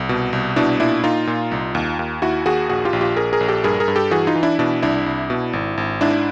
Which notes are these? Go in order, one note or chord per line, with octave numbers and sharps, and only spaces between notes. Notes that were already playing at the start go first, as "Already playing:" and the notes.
Already playing: C2
B2
C2
B2 D4 E4
A#2 D4 E4
A#2 D#4 F4
A#2
C2
D#2
D#2
D#2 E4 F#4
D#2 F#4 G#4
A#1 F#4 G#4
F4 G4
A#1
F4 G4
A#1 G#4 A#4
G#4 A#4
A#1
G4 A4
G2 G#4 A#4
G#4 A#4
G2
G4 A4
E3 F#4 G#4
D#4 F4
E3
D4 E4
B2 D4 E4
C2 D4 E4
C2
B2
G#1
G#1
G#2 D4 E4